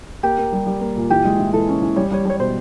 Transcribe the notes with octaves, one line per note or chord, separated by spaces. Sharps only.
A#3 G4
A#3
G3
G3
A#3
A#2
E3 G4
G#3
E3
E3 A4
C#4
E3
G3 C#5
G3 C#5
G3 C#5
B2 C5